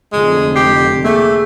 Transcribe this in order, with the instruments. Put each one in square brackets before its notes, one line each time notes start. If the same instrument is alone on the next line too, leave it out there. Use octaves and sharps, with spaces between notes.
[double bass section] F1 F2 D3 [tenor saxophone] G#3
[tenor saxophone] G4 [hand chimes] C7
[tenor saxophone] A3 [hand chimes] A#3 G#4